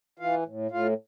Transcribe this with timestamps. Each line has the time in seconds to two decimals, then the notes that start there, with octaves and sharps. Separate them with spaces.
0.19 E3 F4 F5
0.46 A2
0.71 A2 F4 F5